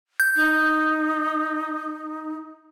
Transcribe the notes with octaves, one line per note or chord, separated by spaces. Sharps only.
G6
D#4